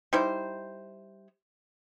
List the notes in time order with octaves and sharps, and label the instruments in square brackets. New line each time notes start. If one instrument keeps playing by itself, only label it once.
[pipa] G3 D#4 E4 C5